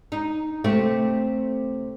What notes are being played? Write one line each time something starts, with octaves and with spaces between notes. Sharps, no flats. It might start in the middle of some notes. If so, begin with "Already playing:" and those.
D#4
C3 A3 C4